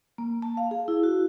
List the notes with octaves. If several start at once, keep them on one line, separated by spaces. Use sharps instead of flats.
A#3
A5
F5
G#4
E4
F#4